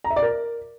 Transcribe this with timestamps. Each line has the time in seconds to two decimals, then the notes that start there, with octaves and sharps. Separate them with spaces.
0.04 A#5
0.10 E5
0.16 D5
0.22 A#4